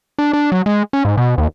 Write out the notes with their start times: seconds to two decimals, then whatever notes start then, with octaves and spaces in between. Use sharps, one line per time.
0.19 D4
0.33 D4
0.52 F#3
0.66 G#3
0.93 C#4
1.05 G#2
1.17 B2
1.38 D#2